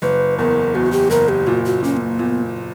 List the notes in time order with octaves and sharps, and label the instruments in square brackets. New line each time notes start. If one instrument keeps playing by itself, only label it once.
[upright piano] F#1 [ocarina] B4
[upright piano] E2 [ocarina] A#4
[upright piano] E2 [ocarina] F#4
[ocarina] G4
[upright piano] F#1 [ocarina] A#4
[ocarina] G4
[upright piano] A#2 [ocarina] F#4
[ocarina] F#4
[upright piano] A#2 [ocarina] C#4
[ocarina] B3
A#3
[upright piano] A#2 [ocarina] B3